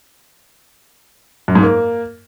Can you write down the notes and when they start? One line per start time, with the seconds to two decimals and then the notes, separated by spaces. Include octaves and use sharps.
1.48 F#2
1.55 G#2
1.63 A#3